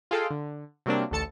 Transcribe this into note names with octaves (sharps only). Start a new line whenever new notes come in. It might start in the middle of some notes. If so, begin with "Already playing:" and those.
F4 G#4 A4 D#5 F5 G5
D3
C3 F#3 G3 A#3 C4 D4
A1 D2 A4 A5 C#7